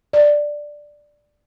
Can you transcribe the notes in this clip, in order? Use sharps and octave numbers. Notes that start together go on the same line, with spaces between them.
D5